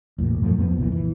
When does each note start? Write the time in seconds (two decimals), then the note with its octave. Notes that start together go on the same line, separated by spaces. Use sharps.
0.18 A1 E2 A#2
0.42 F#2 F3 A3
0.58 F2 F3 B3
0.78 B1 A#2 E3
0.92 E3